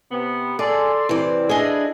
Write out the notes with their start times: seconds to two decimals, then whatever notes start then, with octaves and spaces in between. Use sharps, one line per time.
0.11 C3 B3
0.59 G#4 A4 D5 C6
1.09 C3 E3 C4 D5
1.49 D4 E4 G#4 D#5